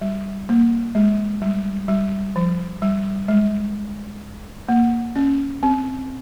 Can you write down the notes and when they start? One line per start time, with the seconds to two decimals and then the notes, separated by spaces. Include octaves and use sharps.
0.01 G3
0.49 A#3
0.95 G#3
1.42 G3
1.88 G3
2.36 F3
2.82 G3
3.28 G#3
4.68 A#3
5.16 C#4
5.63 C4